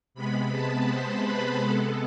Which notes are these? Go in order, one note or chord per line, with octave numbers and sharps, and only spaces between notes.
C3 G#3 B3 B5
A5
C5
B4
C3 G#3 B3 A4